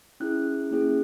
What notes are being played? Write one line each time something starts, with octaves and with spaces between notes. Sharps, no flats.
C#4 E4 G#4 F#6
A#3 C#4 E4 G#4